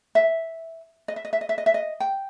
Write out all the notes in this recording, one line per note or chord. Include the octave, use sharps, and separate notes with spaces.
E5
D#5
E5
D#5
E5
D#5
E5
D#5
E5
D#5
G5